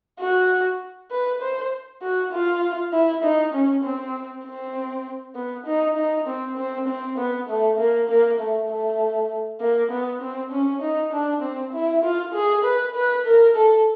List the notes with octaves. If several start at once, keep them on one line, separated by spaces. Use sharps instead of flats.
F#4
B4
C5
F#4
F4
E4
D#4
C#4
C4
C4
B3
D#4
D#4
C4
C4
C4
B3
A3
A#3
A#3
A3
A3
A#3
B3
C4
C#4
D#4
D4
C4
E4
F4
G#4
B4
B4
A#4
A4